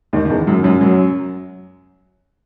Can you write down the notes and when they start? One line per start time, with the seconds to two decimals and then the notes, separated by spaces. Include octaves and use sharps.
0.13 D#2 D#3
0.25 D#3
0.30 E2 E3
0.47 F#2 F#3
0.64 F#2 F#3
0.81 F#2 F#3